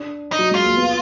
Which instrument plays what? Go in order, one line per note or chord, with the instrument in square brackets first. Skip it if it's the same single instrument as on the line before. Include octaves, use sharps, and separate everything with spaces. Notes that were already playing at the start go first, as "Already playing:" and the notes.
Already playing: [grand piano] D4
[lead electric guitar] D#4
[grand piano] F#3
[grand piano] G#3 [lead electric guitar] F4
[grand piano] A#3
B3